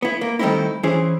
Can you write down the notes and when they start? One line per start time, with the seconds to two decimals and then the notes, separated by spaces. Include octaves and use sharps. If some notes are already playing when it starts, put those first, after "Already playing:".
0.02 B3 E4
0.21 A#3
0.39 D#3 G3 A3 C4 D#4 E4
0.83 E3 C#4 E4 G#4 C5